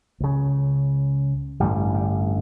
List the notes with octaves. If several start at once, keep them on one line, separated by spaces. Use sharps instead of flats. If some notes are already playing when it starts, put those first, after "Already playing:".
C#2 C#3
A1 G2 D3 G3
G3